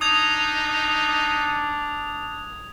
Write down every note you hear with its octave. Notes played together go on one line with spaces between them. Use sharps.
D4 D#4 D#6 G#6 F7